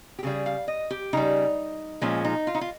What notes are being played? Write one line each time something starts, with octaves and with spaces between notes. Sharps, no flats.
G4
C#3 G3 G#4
F5
D#5
G4
C#3 G3 D#4
A#2 F3 G#3 C#4
D#4
F4
D#4
F4